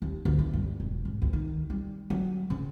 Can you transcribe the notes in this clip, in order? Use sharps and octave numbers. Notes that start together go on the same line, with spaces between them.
D#2
D2
E3
G2
E1
G#2
D2
D#3
G3
F#3
C#3